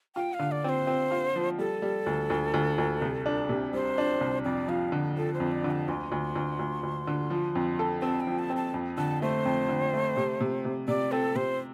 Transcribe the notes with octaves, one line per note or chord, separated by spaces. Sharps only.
F4 G5
F5
D3
D5
C4 C5
C4
F4
F3
G3 A4
G3
D2
D2
D2
D2
C2
D4
C3
G3 C5
D4
C2
F2 D5
F3 F5
D3
F3 A4
C5
F2
D5
D3
A5
D2 C6
D2
D2
D2
D2
D3
F3
F2
A4
C4 A5
G5
F3
A5
C4
A5
F2
D3 A5
A3 C5
F2
D3
A3
C3
C3
C3
C3 D5
C4 A4
C3 C5